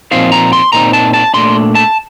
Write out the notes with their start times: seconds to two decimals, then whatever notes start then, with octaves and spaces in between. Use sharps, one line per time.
0.12 A#2 F3 C4 D#4 F5
0.32 A#5
0.53 C6
0.72 A#2 F3 C4 D#4 A#5
0.93 A5
1.14 A5
1.34 A#2 A3 D4 C6
1.75 A5